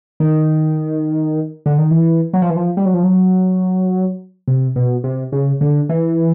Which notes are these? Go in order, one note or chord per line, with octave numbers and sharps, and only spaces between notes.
D#3
D3
D#3
E3
F#3
F3
E3
F3
G3
F#3
F3
F#3
C3
B2
C3
C#3
D3
E3